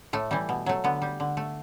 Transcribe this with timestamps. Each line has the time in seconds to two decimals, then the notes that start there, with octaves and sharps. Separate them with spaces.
0.13 A2 A3
0.31 E3 G3
0.49 B2
0.66 F#3 A3
0.84 D3 B3
1.02 G3
1.20 D3
1.37 A3